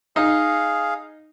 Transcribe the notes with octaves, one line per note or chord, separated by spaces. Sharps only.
D#4 G#4 F5